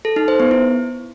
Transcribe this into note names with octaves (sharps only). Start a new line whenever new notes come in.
A4
D#4
C5
B3
E4